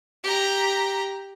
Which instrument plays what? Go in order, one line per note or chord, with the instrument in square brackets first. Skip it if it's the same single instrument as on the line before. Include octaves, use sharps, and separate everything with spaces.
[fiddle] G4 A#5